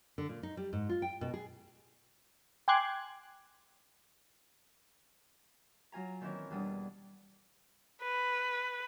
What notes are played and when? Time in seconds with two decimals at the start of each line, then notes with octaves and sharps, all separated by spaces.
0.18 D3
0.29 A#2
0.43 D#4
0.57 G3
0.73 G#2
0.89 F4
1.02 G5
1.21 B2
1.34 G#4
2.68 G5 G#5 C6 D6 F#6 G#6
5.92 F#3 F4 G#5 A#5
6.21 A#2 D#3 E3 C4 C#4
6.51 E2 B2 G3 D4 D#6
8.02 B4